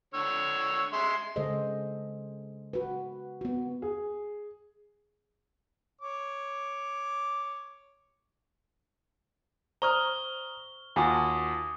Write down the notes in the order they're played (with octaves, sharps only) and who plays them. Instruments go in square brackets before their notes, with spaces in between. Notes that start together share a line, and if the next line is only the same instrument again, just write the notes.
[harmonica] D3 C#5 E6
G#3 E5 C6
[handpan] C#3 G#3 G#4 A4 C5 D#5
F#4 B4
B3 F#4
[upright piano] G#4
[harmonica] C#5 D6
[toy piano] C5 D5 [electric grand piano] A#5 D#6 F6 [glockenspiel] C#6 G7
[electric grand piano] D#2 F4 F#4 [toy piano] G#5 A5 [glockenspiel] D6 D#6